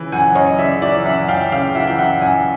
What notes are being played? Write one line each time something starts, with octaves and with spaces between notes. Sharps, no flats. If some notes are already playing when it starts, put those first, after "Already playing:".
Already playing: C#3 E3
F#2 F#5 G#5
F#2 C#5 D#5
C#3 D5 E5
E3 D5 E5
F#2 E5 F#5
F#2 F5 G5
C#3 F5 G5
E3 E5 F#5
G5
F#2 E5 F#5
F#2 F#5 G#5